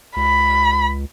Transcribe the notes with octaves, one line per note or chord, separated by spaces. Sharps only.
C#2 B5